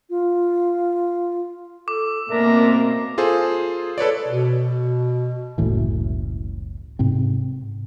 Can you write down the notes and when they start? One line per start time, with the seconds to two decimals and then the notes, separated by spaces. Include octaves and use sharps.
0.10 F4
1.88 A4 D6
2.29 B2 A#3 C4 D4 A#4 E5 A#5
3.18 F4 G#4 A4 C5
3.98 A4 B4 C#5 D5
4.28 B2
5.58 F#1 C#2 A2 E3
6.99 G#2 C3 C4